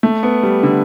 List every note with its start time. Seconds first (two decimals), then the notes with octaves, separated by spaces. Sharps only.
0.03 A3
0.23 B3
0.43 G3
0.63 D3